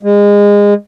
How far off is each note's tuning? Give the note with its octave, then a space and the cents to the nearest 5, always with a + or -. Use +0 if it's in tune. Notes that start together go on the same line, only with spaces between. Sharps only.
G#3 -25